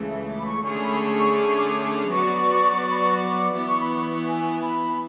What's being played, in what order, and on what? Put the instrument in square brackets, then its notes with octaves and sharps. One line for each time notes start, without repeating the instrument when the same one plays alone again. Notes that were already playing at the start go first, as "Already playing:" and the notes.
Already playing: [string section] C#2 C#3 E3 A3
[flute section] E5
D6
B5
C#6
[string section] D3 A3 C#4 G#4 C#5 [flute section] C#6
[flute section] B5
A5
C#6
D6
C#6
D6
[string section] F#3 B3 F#4 B4 D5 [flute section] C#6
[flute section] C#6
B5
C#6
D6
[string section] E3 B3 E4 [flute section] D6
[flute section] C#6
B5
C#6
G#5
B5